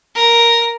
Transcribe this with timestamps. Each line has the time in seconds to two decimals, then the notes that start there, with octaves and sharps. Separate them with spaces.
0.15 A#4